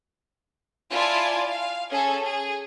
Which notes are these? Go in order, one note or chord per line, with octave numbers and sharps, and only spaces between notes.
E4 F4 D5 G#5 A5
F5
C#4 G#4 A4
G#4